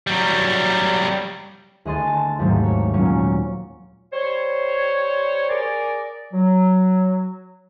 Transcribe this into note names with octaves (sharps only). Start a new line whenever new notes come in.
F#3 G3
D2 G#4 D#5 C6 A6
A5
D#2 G#2 C3 F#3 A3
C#5
A#2 F#3 C#4 C#6
G3 C5 C#5
G#4 A#4 D5
F#3